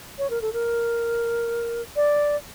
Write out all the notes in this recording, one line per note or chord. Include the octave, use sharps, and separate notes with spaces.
C#5
A#4
A4
A#4
D5